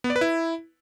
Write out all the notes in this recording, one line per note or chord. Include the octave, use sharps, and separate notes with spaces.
B3
D5
B4
E4